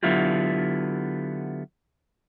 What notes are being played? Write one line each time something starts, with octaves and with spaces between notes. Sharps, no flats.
D3 F#3 B3 E4 F4 G4